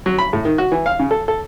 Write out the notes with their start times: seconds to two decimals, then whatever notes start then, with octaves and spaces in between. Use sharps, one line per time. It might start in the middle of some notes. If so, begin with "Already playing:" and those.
0.06 F#3
0.19 B5
0.33 A2
0.45 D#3
0.58 F#4
0.72 E3
0.86 F5
0.99 C#3
1.11 A4
1.28 A4